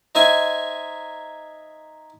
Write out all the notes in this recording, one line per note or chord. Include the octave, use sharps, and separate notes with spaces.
D#4 C5 E5 G#5